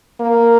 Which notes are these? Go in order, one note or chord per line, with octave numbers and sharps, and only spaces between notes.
A#3